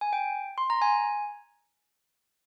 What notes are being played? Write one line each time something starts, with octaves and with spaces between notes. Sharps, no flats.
G#5
G5
C6
A#5
G#5